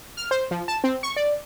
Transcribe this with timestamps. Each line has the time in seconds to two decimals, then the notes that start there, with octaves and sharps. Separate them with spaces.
0.17 F6
0.31 C5
0.51 F3
0.68 A5
0.84 C4
1.03 C#6
1.16 D5